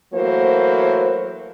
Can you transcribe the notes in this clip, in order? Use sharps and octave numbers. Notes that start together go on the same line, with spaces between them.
E3 F#3 A3 A#3 C5